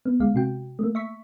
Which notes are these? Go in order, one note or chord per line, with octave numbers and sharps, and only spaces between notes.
B3
D2 G#3 F5
C3 F#4 G5
A3 A#3
E5 C#6 B6